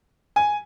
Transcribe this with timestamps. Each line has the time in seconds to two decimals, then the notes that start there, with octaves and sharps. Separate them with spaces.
0.36 G#5